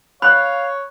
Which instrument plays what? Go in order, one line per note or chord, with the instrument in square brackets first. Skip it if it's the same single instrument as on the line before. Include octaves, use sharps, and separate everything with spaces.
[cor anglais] C#5 [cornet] F5 [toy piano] B5 [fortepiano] F#6